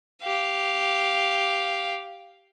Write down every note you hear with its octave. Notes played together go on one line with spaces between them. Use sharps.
G4 F5